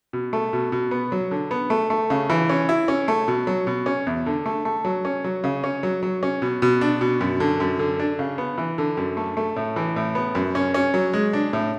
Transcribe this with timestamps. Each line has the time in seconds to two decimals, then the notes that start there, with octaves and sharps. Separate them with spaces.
0.13 B2
0.33 A3
0.53 B2
0.72 B2
0.91 B3
1.12 F#3
1.31 D3
1.51 B3
1.70 A3
1.90 A3
2.10 C#3
2.30 E3
2.49 C#4
2.69 E4
2.88 C#4
3.08 A3
3.28 B2
3.47 F#3
3.67 B2
3.86 C#4
4.07 E2
4.26 D3
4.46 A3
4.65 A3
4.85 F#3
5.05 C#4
5.24 F#3
5.44 C#3
5.64 C#4
5.83 F#3
6.03 F#3
6.23 C#4
6.42 B2
6.62 B2
6.81 D4
7.01 B2
7.21 F#2
7.40 D3
7.60 F#2
7.79 D3
7.99 D4
8.19 C#3
8.38 B3
8.58 E3
8.78 D3
8.97 F#2
9.17 A3
9.37 A3
9.56 A2
9.76 E3
9.96 A2
10.15 B3
10.35 F#2
10.55 C#4
10.74 C#4
10.94 F#3
11.13 G#3
11.33 D4
11.53 A2